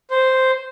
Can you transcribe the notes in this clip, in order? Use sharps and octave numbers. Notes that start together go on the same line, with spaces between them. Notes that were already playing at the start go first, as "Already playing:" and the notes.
C5